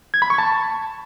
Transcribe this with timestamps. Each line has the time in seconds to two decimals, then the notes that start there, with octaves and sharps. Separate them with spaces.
0.14 G#6
0.22 B5
0.30 C#6
0.38 A5